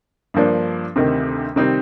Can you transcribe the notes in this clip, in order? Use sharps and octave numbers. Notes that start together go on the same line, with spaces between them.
G2 F3 A#3 D4
D2 C3 D#3
C3 D#3 G3 C4 D#4